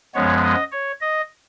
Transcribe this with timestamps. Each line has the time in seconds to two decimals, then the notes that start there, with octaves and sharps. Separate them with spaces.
0.14 F#2 F3 G#3 B3 C#5
0.43 D#5
0.72 C#5
1.01 D#5